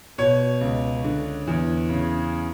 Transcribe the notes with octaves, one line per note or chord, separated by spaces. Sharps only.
B2 C#5
C#2
D3
E2
C#3